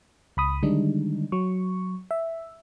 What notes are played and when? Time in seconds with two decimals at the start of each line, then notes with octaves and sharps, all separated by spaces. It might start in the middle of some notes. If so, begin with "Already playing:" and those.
0.37 C#2 B5 D#6
0.63 D3 D#3 G3 G#3 D4 D#4
1.32 F#3 C#6
2.11 E5